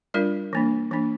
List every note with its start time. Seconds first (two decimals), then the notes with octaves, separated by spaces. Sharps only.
0.14 G3 D4 F4 A#4 D5
0.53 E3 A#3 D4
0.91 E3 A#3 D4